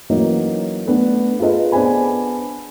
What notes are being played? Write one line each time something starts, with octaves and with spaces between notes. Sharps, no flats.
E3 F#3 A#3 C#4 D#4
A3 B3 D4
F4 G#4 A4 B4 D#5
B3 D4 G#4 C5 G#5 B5